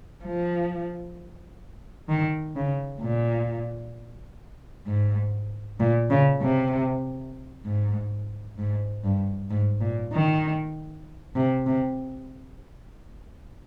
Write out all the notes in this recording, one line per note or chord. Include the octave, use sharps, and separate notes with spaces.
F3
D#3
C#3
A#2
G#2
A#2
C#3
C3
G#2
G#2
G2
G#2
A#2
D#3
C3
C3